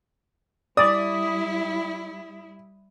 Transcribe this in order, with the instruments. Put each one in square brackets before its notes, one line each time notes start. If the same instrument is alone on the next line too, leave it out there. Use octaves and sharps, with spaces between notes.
[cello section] G3 E4 [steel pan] D5 [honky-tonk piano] D#6